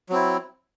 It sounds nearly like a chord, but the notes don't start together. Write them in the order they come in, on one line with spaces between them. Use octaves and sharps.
F#3 C4 E4